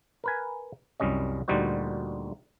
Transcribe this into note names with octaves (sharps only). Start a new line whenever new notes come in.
A#4 B4 G#5
C2 F#2 G3 C#4 D#5
D2 A#2 G3 D#4 F#4 C5